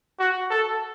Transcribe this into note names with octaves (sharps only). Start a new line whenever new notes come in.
F#4
A4